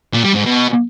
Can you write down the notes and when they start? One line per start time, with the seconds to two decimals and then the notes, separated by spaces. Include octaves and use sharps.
0.13 A#2
0.24 G3
0.34 G#2
0.45 B2